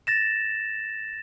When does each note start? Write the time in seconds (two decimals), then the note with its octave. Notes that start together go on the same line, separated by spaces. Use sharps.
0.07 A6 A#6 E7